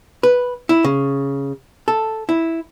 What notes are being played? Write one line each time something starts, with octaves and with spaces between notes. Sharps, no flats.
B4
E4
C#3
A4
E4